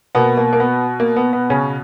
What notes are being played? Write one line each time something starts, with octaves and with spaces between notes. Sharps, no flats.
B2 A#3 B3
A#3
A#3
B3
A#3
B3
B3
C#3 C#4